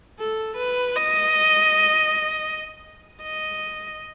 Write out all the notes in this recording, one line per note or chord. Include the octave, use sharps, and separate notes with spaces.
A4
B4
D#5
D#5